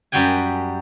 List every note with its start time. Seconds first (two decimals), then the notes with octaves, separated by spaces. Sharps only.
0.12 F#2 G3 F#4 G5 G#5